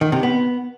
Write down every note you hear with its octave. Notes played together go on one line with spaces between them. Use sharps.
D#3
C3
B3